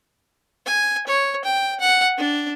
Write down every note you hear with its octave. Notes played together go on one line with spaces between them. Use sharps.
G#5
C#5
G5
F#5
D4